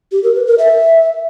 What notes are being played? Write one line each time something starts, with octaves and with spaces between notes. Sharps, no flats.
G4
A#4
B4
A#4
E5